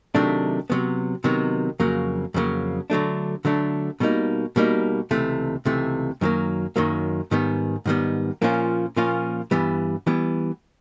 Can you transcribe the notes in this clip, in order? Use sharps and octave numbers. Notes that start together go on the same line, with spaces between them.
C3 D#3 F#3 A3 D4
C3 D#3 F#3 B3
C3 D#3 F#3 B3
F2 C#3 F#3 A#3
F2 C#3 F#3 A#3
D3 F#3 A3 D4
D3 F#3 A3 D4
B2 G3 A#3 D#4
B2 G3 A#3 D#4
C#2 C3 E3 A3
C#2 C3 E3 A3
F#2 D#3 F#3 A#3
F#2 D#3 F#3 A#3
G#2 D#3 G3 B3
G#2 D#3 G3 B3
A#2 F3 A#3 C#4 F4
A#2 F3 A#3 C#4 F4
G2 E3 G3 B3
E3 G3 B3